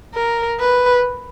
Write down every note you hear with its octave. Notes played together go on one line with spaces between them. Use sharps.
A#4
B4